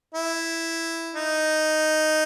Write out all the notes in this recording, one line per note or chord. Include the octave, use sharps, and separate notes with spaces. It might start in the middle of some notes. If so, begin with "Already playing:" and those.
E4
D#4